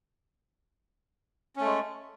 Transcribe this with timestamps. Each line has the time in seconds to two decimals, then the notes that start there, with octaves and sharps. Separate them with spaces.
1.56 C#4
1.60 A3
1.65 G#3